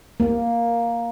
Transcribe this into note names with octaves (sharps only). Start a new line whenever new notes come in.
A#3